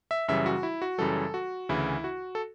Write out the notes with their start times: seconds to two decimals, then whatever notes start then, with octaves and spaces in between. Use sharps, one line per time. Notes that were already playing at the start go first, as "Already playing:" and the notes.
0.11 E5
0.28 F#2 C#3 E3 G3 E5
0.46 F#4
0.63 E4
0.82 F#4
0.98 F#2 C#3 E3 G3 A4
1.34 F#4
1.69 D2 C#3 E3 E4
2.04 F#4
2.35 A4